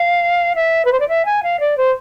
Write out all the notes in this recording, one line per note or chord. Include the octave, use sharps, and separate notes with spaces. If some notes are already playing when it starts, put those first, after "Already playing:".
Already playing: F5
E5
B4
C5
D5
E5
G#5
F5
D5
C5